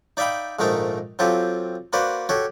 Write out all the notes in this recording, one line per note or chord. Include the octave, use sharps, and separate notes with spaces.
D#4 D5 E5 F5 G5 B5
A#1 G#2 D#3 A3 D#4 A#4
F#3 C4 F4 G4 A4
A#3 F#4 B4 C5 D5
F#4 G4 A4 C#5